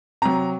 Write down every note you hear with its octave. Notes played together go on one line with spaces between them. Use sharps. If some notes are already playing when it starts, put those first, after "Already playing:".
C3 F#3 A#5